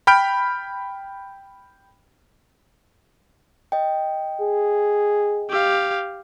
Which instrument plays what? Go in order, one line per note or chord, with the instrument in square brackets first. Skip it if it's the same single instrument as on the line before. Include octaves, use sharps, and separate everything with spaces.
[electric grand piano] G5 B5 F6 G6 D7
[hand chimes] D#5 G5
[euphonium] G#4
[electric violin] G4 F5